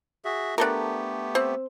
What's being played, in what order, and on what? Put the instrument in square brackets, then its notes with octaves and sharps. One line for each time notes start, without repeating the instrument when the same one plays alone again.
[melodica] F#4 G#4 E5
[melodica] A3 B3 G4 [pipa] D4 A4 A#4
[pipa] C4